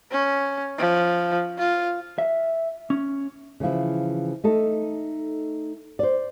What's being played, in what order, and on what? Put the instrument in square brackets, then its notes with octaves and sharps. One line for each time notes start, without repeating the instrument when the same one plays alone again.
[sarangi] C#4
F3
F4
[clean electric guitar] E5
C#4
[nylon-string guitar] C#3 E3 F3 E4
A3 D#4 A4 D#5
C5 D5